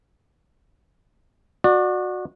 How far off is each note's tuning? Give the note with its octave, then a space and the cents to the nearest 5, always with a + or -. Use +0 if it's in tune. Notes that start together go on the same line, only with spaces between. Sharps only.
F#4 -20 D5 +25